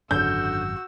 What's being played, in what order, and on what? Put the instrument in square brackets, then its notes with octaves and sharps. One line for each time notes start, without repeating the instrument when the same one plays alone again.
[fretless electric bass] G#1 F#2 [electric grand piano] D3 [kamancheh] F#4 E6 [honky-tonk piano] G6